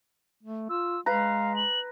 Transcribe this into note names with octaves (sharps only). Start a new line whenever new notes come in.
A3
F4 E6
G#3 B4 F5 A#5
F#7